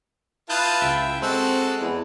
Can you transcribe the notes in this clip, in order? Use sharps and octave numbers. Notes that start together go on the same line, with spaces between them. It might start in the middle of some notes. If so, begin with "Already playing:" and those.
E4 F4 B4 A5 D#6 F#6 G6
C#2 E5 G5
G#3 C4 F#4 A4
E2